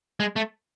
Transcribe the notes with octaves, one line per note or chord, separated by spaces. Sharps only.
G#3
A3